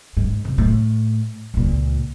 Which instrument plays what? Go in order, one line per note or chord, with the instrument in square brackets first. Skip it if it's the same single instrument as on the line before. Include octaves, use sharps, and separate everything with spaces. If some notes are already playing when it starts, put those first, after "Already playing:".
[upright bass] G#2
F1
A2
C#2 A#2